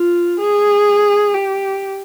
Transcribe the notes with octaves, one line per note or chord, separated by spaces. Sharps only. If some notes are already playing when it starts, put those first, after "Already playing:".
Already playing: F4
G#4
G4